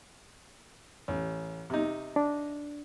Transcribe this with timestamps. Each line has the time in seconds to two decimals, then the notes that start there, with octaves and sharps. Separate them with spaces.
1.08 A1
1.70 C3 D#4
2.16 D4